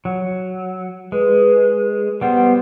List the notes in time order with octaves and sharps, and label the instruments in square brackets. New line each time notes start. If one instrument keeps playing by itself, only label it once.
[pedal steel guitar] F#3
[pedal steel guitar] G#3 [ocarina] B4
[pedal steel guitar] G3 B3 C5 [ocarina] F#5